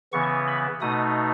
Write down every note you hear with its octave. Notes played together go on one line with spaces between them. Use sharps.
C#3 E3 B3 C#6
B5
B2 A3 D#4 D#6